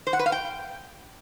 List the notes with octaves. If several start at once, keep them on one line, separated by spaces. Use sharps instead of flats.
C5
F#5
B4
F5
G5